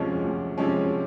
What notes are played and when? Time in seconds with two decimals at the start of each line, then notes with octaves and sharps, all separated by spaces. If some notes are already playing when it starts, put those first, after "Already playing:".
Already playing: D2 C3 F3 G#3 C#4
0.23 D2
0.58 C3 F3 G#3 C#4